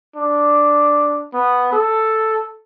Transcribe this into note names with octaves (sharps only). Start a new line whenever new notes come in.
D4
B3
A4